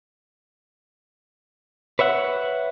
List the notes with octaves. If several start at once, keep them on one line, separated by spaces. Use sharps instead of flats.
B4 C#5 E5 F#5